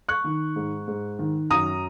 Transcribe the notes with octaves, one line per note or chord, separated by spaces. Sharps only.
C#6 F#6
D#3
G#2
G#2
D#3
F#2 A#5 D#6